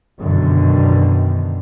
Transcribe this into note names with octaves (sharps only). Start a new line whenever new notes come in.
F#2 B2 D3 D#3